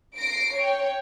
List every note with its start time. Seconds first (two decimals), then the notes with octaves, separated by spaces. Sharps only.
0.17 A#6 C7 D7
0.56 C#5 G5